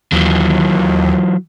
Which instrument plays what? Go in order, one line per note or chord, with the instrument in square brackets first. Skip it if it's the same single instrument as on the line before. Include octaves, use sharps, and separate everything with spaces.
[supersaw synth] D#2 [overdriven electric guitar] E3 F#3